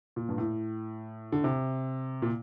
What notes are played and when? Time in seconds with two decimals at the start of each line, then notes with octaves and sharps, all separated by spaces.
0.16 A#2
0.29 G2
0.38 A2
1.32 D3
1.44 C3
2.22 A#2